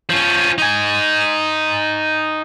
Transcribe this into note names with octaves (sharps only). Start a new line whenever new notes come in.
F3 C#4
D#4 G#5